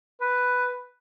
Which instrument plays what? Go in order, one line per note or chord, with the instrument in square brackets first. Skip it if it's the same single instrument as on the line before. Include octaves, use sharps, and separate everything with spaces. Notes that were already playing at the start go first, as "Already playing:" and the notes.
[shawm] B4